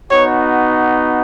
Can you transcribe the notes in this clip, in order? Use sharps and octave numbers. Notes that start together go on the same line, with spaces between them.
B3 D#4 F#4 C#5